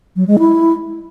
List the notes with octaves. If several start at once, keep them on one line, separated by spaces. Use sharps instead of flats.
F#3
G#3
E4